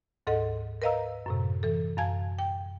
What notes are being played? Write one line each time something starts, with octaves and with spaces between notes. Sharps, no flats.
D2 G#2 A4 D#5 F#5
A#4 B4 D#5 F5 A#5 E6
F#2 A2 C3
E3 A4
F#2 F5 G#5 A5 G#6
G5